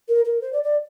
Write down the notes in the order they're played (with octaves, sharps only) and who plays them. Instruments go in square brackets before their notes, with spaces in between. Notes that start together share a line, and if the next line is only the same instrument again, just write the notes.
[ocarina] A#4
A#4
C5
D5
D5